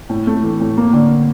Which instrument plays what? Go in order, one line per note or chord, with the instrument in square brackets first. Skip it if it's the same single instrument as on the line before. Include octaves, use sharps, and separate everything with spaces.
[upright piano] A2
A3
E3
A2
A#3
D3